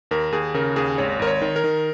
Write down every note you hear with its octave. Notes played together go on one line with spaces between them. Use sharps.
D#2 A#4
D#2 G#4
C#3 A#4
D#2 G#4
G#1 C#5
G#1 A#4
C#5
D#3
A#4
D#3